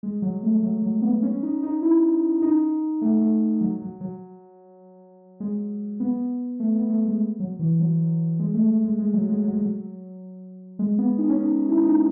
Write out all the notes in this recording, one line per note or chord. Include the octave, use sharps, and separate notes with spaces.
G#3
F#3
A3
F#3
F#3
B3
C#4
D#4
D#4
E4
D#4
A3
A3
F#3
F#3
F#3
G#3
B3
A3
B3
A3
G#3
F#3
E3
F#3
G#3
A3
A3
G#3
G#3
F#3
G#3
F#3
G#3
F#3
G#3
B3
D#4
C#4
D#4
E4
D#4